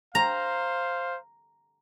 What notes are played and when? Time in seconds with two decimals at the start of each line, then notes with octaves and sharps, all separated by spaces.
0.15 C5 F5 A#5